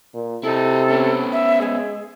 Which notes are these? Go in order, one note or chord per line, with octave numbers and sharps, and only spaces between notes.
A#2
C3 E4 A4 D#5
B3 C#4
E5
G#3 G#4